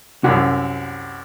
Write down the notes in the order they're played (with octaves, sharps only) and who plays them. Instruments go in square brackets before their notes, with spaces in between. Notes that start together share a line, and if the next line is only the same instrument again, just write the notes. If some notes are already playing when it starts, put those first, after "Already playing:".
[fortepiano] C2 F#2 [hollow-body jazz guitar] F#4 F#5